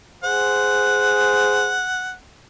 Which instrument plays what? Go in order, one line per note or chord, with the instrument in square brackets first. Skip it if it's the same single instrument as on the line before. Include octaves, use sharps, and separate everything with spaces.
[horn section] G#4 C5 [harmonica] F#5